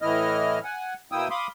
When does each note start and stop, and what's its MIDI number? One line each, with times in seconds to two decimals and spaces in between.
0.02 0.59 45
0.02 0.59 52
0.02 0.59 64
0.02 0.59 75
0.02 0.59 89
0.64 0.94 78
0.64 0.94 80
1.12 1.28 47
1.12 1.28 58
1.12 1.28 64
1.12 1.28 79
1.12 1.28 87
1.12 1.28 88
1.30 1.47 77
1.30 1.47 83
1.30 1.47 84
1.30 1.47 86
1.30 1.47 87